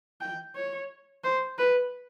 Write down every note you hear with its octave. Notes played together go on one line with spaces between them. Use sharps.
G5
C#5
C5
B4